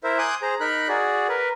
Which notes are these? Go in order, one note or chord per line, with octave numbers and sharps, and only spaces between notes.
E4 A#4 C5 E5
G#5 C6 D6 D#6 F#6 G6
G#4 C5 A#5
D#4 A#4 B5 F#6
F#4 G#4 D5
A#4 B4